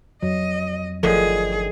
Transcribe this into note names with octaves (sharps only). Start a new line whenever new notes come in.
F2 F#3 D#5
G1 A2 D3 D#3 F3 G#4